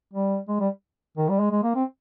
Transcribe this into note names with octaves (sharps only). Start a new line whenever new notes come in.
G3
G#3
G3
D#3
G3
G#3
G#3
A#3
C4